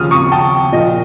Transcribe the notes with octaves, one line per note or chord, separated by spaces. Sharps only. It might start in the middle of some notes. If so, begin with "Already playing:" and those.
Already playing: D#2 C#3 F3 D#6 F6
C#6 D#6
G5 A5
A#2 F3 A#3 D#5